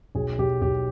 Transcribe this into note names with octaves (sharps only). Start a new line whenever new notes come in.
B1 G#4
B1 G4
B1 G4